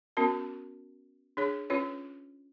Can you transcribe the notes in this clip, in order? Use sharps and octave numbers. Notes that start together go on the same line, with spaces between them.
B3 C#4 F#4 A#4 A5
D4 G#4 C#5
C#4 F4 B4 C#5